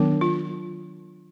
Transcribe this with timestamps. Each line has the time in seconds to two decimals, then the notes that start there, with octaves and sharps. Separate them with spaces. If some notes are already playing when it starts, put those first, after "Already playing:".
Already playing: D#3 F#3 B3 D4
0.21 F4